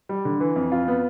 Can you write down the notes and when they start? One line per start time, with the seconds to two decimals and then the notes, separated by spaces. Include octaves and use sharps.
0.09 G3
0.25 D3
0.40 E3
0.56 F2
0.72 F4
0.88 B3